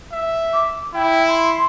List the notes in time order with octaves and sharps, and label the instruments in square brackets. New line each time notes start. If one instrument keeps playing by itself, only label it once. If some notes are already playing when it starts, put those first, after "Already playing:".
[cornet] E5
[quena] D6
[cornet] E4 [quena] G5
[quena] C6